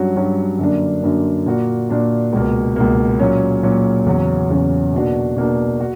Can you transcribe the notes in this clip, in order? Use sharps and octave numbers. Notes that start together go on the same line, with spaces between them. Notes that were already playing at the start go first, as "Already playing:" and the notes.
Already playing: G2 F#3 C#4 F#4
G2 F#3 C#4 F#4
F#2 D3 A#3 D4
F#2 D3 A#3 D4
A#2 A#3 D4 F#4
A#2 A#3 D4 F#4
C#2 B2 A#3
C#2 B2 A#3
A#2 F#3 C#4
A#2 F#3 C#4
E2 C#3 F#3 C#4
E2 C#3 F#3 C#4
B2 A#3 D4 F#4
B2 A#3 D4 F#4
F#4